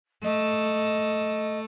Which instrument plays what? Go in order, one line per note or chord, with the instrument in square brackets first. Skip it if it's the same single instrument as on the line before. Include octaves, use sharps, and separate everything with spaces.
[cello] A3 [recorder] D#5